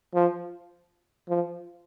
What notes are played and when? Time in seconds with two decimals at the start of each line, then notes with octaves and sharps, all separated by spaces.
0.15 F3
1.29 F3